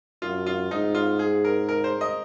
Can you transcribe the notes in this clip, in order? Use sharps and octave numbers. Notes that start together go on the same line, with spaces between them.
F#2 F4
F4
G#2 D#4
F4
G#4
A#4
A#4
C5
D#5